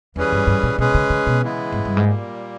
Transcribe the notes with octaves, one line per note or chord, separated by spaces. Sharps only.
E2 E3 G3 C#4 G#4 B4
G2
G2
A#2
B2 G#3 C#4 G#4 B4
C#3
C#3
B2
C#3 E3 G#3 B3 E4
G#2
G2
G#2
A#2 G3 A#3